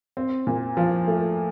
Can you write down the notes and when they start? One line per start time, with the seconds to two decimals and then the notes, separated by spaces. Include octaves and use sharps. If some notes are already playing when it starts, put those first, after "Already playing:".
0.17 C4
0.47 A#2
0.77 F3
1.07 A3